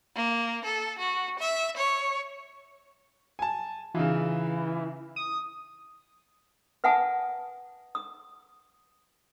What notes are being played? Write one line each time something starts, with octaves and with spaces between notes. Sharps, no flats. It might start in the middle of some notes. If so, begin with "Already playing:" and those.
A#3
A4
F#4
E5
C#5
G#5 A5
C#3 E3 D#4 F4
D#6
B4 E5 F#5 G#5 A5 D#6
D#6